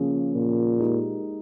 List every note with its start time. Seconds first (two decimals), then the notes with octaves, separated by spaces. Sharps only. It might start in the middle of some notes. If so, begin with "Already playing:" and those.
Already playing: C#3 F3 A#3 C#4 G#4
0.35 A#2
0.80 G#3 D#4 G4